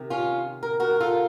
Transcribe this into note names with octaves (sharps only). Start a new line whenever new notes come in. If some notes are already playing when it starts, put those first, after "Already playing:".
Already playing: C3 D#3
C#4 F4
A#4
F#4 A#4
F4 A4